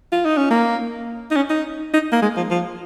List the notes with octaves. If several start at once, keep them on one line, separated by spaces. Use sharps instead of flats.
F4
D#4
C#4
A#3
D#4
C#4
D#4
D#4
A#3
G#3
F3
F3